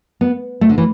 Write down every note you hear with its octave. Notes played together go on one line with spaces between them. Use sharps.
B3
A3
D3
E3